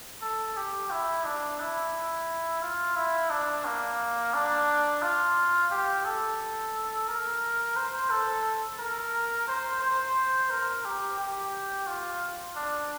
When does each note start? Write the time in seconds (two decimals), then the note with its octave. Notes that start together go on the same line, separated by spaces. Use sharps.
0.22 A4
0.57 G4
0.91 E4
1.25 D4
1.60 E4
2.62 F4
2.96 E4
3.30 D4
3.65 A#3
4.34 D4
5.02 F4
5.71 G4
6.05 A4
7.08 A#4
7.76 C5
8.10 A4
8.79 A#4
9.48 C5
9.82 C5
10.50 A#4
10.85 G4
11.19 G4
11.87 F4
12.56 D4